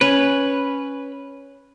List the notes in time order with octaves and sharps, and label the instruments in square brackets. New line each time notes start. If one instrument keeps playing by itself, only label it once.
[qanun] C#4 [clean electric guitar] B4